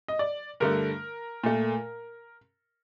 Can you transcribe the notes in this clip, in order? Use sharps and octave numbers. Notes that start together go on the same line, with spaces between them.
D#5
D5
G2 D3 A3 A#4
A#2 A3